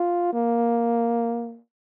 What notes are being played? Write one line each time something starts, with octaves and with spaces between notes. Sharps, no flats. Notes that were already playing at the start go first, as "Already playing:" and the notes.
Already playing: F4
A#3